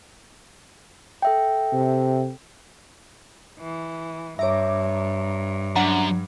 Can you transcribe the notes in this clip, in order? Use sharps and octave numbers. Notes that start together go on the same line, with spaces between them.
A4 E5 G5
C3
E3
G2 C#5 E5 A#5 D6
F#2 D4 F#5 A#5